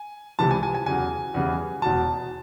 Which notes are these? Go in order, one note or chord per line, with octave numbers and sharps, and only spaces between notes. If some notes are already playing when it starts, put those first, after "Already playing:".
Already playing: G#5
C#2 C3 E3 G3 A5
G#5
G#5
G#5
E2 C#3 F#3 G#5
E2 C#3 E3 G3
E1 E2 B2 A5